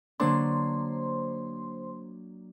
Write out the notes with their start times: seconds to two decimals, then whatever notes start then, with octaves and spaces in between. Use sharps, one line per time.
0.20 D3 F#3 A#3 D4 C5 C6